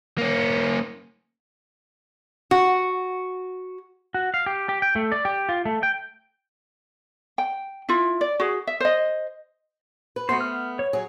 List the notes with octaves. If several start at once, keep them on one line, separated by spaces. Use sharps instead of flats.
A#3 C#4
F#4
F#4
F5
G4
G4
G5
A3
D5
G4
F4
A3
G5
G5
E4 F4
D5
F#4 G#4
E5
C5 D#5
B4
A3 B3 F#4 C5
F6
C#5
F#3 G#4